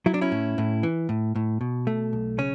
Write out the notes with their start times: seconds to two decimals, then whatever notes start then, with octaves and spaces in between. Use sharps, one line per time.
0.06 F#3 E4
0.14 D4
0.21 C#4 E4
0.32 A2
0.58 A2
0.83 E3
1.09 A2
1.36 A2
1.61 B2
1.87 A3
2.13 B1
2.38 C#3 C#4